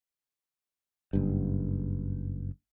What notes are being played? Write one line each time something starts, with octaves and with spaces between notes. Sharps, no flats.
F#1 G2